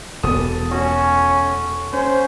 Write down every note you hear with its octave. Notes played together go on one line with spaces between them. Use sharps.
E1 B3 A4 D#6
C#4 F#4
C#4 C5